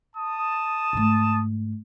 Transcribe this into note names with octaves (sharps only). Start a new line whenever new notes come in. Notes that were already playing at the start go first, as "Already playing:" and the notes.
A5 D#6
G#2 A3